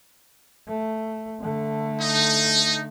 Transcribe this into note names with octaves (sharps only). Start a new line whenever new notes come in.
A3
D3 A3
D#4